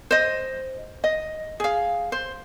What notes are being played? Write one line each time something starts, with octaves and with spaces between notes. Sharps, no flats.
C5 D#5
D#5
G#4 F5
C5